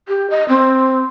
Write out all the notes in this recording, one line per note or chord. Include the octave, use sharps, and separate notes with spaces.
G4
D#5
C4